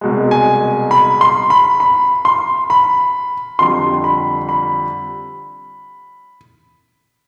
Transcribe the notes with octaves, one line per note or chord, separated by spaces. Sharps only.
C2 B2 G#3
G#5
B5
C6
B5
B5
C6
B5
F2 D3 G3 C6
B5
B5